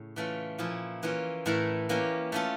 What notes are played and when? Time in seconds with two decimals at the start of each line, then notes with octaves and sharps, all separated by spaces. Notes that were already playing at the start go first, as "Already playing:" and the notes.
Already playing: A2 C#3
0.16 E3 A3 C#4 F4
0.59 A#2 F3 C#4 E4
1.03 E3 A#3 C#4 F4
1.46 A2 E3 A3 E4 A#4
1.89 E3 A#3 C#4 G4
2.32 A3 C#4 F4 A4